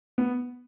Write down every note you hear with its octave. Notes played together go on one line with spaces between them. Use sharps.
B3